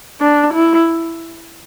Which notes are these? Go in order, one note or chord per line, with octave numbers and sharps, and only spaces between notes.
D4
E4